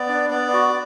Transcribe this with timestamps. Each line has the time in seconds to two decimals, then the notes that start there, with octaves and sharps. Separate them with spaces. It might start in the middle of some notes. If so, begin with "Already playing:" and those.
Already playing: B3 D5
0.09 D4
0.30 B3 D5
0.53 F#4